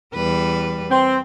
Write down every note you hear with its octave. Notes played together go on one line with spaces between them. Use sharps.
E2 G3 B4
C4